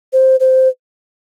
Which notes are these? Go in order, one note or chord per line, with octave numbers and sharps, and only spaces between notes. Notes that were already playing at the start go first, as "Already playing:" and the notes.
C5
C5